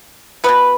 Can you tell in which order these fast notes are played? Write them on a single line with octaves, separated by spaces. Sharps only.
F#3 B3 B4 B2